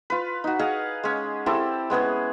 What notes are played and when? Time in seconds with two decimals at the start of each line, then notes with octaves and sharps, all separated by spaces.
0.10 F4 B4
0.44 D#4 F#4
0.59 G#4 D#5 F5 F#5
1.03 G#3 C#4
1.46 C4 E4 G4 A4
1.90 G#3 B3 C#4 G#4